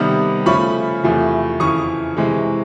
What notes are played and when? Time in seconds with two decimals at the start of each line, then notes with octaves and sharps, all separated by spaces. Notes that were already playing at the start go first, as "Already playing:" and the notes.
Already playing: C3 D#3 G3 B3
0.46 C#3 F3 A3 C#4 B5 C#6
1.04 E2 C3 F3 A3
1.60 F2 C#3 E3 C#6 D#6
2.17 C3 E3 G#3